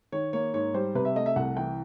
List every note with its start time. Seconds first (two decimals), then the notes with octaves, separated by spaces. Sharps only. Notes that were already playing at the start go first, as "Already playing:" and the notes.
0.12 D#3 C#5
0.33 A#3 C#5
0.53 G#2 C#5
0.74 G3 C5
0.95 C3 B4
1.05 E5
1.15 A3 D#5
1.26 E5
1.36 C2 F#5
1.57 E3 G5